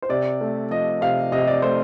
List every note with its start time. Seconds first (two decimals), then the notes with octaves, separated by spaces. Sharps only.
0.02 C5
0.09 C3 D5
0.41 A3
0.71 F3 D#5
1.01 C3 F5
1.32 C3 D#5
1.47 D5
1.62 A3 C5